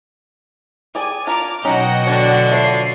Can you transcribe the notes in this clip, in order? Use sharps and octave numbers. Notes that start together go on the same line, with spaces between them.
G4 G#4 D5 G#5
D4 F4 A#4 D6 F6
B2 F#3 C#4 D#4 F#4 D#5 F#5 G5
D3 D4 C#5
F3 A3 C#5 C7